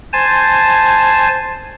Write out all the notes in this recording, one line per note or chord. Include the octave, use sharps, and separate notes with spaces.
C5 G#5 A5